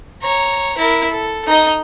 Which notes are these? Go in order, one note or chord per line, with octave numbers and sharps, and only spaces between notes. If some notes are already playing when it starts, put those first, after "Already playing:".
C#5 A#5
E4 A#4
A4
D#4 D#5